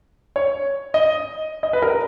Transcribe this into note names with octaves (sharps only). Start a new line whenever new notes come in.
C#5
D#5
D#5
B4
A#4